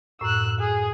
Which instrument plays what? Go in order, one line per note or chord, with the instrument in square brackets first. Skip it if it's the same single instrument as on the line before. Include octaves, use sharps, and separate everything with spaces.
[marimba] F#2 A2 [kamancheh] E6 F#6
[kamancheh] G#4